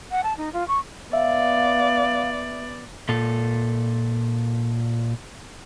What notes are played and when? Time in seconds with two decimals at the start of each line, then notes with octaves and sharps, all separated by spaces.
0.11 F#5
0.23 A5
0.37 D#4
0.53 F4
0.68 C#6
1.13 B3 D5 E5 F5
3.09 A#2 A4